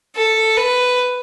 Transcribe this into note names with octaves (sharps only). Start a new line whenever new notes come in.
A4
B4